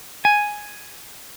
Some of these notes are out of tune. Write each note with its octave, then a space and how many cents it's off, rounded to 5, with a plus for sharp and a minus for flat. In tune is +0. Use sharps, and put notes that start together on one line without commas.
G#5 +0